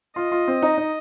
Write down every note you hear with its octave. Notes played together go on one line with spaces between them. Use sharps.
F4 D#5
F4
C4
D#4
D#4